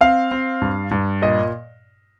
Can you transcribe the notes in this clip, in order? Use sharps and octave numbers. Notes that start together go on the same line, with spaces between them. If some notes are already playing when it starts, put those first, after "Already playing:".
C4 F5
C4
G2
G2
A#2 D#5